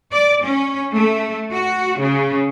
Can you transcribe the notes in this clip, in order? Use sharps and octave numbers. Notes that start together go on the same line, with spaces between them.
D5
C#4
A3
F#4
C#3